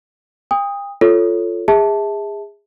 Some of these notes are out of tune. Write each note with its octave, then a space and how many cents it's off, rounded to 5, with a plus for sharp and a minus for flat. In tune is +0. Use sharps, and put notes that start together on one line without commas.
G5 +40 D#6 +5
F4 +0 A4 +0 C#5 +0
G#4 -25 E5 -25 A5 +0